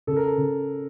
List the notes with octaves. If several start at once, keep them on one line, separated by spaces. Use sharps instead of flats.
C#3 A4
A#4
A4
C#3